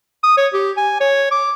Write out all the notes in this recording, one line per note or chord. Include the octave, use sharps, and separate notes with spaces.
D#6
C#5
G4
G#5
C#5
D6